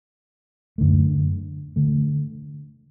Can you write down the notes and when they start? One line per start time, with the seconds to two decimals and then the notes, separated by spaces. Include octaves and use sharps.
0.78 F#2 D3 A3
1.76 D3 A3